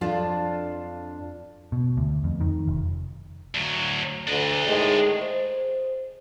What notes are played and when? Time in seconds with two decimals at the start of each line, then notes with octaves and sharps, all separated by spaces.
0.01 F2 D4 F4 F5 A5
1.72 B2
1.97 D2
2.24 F2
2.40 D#3
2.68 F1
3.55 D2 F#3
4.28 D2 D4 D#5
4.66 A2 D#3 G#3
5.21 C5